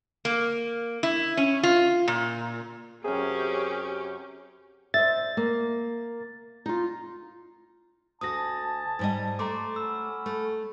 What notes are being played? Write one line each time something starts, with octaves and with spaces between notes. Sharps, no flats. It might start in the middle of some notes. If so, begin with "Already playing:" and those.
A#3
E4
C#4
F4
A#2
F#2 C3 C#4 G4 G#4
C5 D#5 E5 A6
A#3
D#4 F4
D2 F#4 G#5 A5 D#6 A#6
G#2 G3 D#5
A3 A#5 C6 D6
C#4 F#4 B5 E6
A3